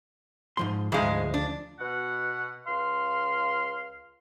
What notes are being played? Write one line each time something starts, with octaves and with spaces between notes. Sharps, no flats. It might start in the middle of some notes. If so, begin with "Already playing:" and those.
G#2 F3 C6
D2 G#2 F3 G#3 F5
D4
B2 F#5
C#2 F5 C6